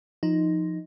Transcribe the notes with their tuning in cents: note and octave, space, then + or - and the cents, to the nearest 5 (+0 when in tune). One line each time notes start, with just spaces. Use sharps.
F3 +0 D#4 +5